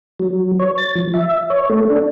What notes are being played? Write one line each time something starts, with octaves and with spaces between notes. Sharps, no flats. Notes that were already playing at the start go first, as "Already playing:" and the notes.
F#3
C#5
A6
F3
E5
C#5
A3
D4